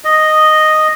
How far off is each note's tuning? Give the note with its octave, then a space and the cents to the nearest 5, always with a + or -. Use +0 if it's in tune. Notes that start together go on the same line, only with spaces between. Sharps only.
D#5 -5